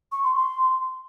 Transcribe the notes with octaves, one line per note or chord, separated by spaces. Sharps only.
C#6
C6
C6